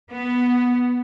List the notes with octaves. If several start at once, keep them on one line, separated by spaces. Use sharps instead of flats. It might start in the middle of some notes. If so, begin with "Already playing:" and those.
B3